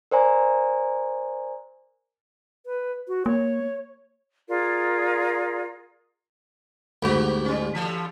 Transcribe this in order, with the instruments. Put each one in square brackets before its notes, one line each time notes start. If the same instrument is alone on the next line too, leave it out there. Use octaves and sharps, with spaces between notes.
[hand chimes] A#4 C5 D5 G#5 A#5
[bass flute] B4
F#4
[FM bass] A#3 [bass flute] C#5
[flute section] F4 G#4 A#4 D5
[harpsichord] D2 G#2 [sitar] A#3 F#4 G4
[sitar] G3 C#4
E3 G3 A4